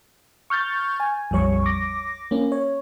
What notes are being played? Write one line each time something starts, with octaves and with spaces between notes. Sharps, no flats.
C#6 F6 G6 A6
G#5
A#1 F2 G3 C#5 C#6
D6 A#6
A#3 C#4
C#5